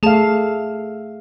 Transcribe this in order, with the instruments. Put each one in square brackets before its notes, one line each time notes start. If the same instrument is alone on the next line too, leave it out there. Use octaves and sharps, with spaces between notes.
[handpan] A3 F5 [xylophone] G#4 A5